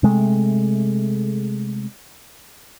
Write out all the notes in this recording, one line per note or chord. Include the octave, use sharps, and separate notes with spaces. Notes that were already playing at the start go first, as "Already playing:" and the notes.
C3 G#3 A3